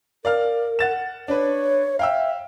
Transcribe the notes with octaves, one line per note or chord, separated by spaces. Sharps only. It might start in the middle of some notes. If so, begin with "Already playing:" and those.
A#4 D5 F5 F6
F#5 A6 E7
D4 B4 C#5
E5 F5 G5 E6